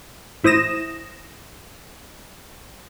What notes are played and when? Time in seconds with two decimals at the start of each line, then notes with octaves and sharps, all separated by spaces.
0.44 A1 E4 C5 D#6 A#6 E7